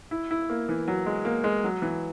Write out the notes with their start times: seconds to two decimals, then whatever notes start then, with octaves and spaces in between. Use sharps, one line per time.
0.11 E4
0.31 E4
0.50 A#3
0.69 E3
0.88 F#3
1.06 G#3
1.25 A#3
1.44 G#3
1.64 F#3
1.82 E3